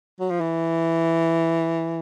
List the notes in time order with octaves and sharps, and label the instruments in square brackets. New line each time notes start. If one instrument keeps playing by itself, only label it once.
[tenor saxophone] F#3
F3
E3